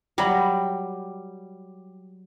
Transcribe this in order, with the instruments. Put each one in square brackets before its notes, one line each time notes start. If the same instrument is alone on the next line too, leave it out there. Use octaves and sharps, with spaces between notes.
[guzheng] F#3 A#5 B5 [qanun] G3